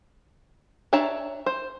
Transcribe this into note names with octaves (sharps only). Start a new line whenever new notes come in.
D4 C#5 E5 A5 A#5
C5